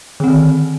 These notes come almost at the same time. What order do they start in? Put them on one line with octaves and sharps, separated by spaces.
D3 C4 D#3